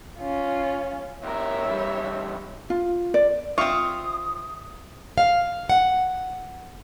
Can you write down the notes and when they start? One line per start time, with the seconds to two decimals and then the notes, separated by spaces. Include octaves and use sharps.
0.18 C#4 F4
1.23 C#2 A#4 C#5 E5
1.65 E2 G3
2.70 F4
3.14 D5
3.58 C4 F4 E5 C#6 D#6
5.18 F5
5.70 F#5